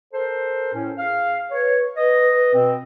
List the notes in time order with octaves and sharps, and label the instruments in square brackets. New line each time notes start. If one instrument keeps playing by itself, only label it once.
[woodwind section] A4 A#4 C5
A2 C#4
[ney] G#4 [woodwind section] F5
[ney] B4 [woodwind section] C#5
[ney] B4 [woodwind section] D#5
[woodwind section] B2 C4